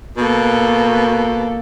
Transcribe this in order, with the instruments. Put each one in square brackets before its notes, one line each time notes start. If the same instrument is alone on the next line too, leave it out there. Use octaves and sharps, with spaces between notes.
[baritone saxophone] B2 [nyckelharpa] A#3 A4